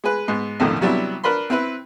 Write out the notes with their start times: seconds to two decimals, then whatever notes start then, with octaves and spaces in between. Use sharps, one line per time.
0.04 G#3 G#4 B4
0.28 G#2 B3
0.60 B1 F2 A2 D3 D#3
0.81 C3 F#3 G3 B3 D4 E4
1.24 D4 A#4 B4 B5 C6
1.50 C4 E4 B4